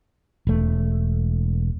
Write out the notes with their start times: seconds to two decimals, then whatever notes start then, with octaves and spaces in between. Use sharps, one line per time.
0.47 E1 A3